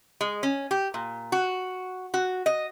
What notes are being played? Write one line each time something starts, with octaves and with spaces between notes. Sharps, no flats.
G#3
C#4
G4
A#2
F#4
F#4
D#5